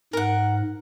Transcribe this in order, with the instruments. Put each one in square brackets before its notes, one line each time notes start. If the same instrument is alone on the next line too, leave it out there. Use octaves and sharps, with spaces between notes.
[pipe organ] G#2 [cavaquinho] A#4 F#5